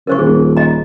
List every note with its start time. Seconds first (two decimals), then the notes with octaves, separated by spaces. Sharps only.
0.07 C#3 A#4 C5 C#6
0.19 D#1 G#4
0.57 D#5 A#5